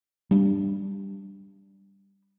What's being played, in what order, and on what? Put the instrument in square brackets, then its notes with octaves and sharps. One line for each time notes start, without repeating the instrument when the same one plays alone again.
[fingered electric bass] G3 D4